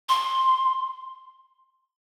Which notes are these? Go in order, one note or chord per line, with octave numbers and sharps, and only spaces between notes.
C6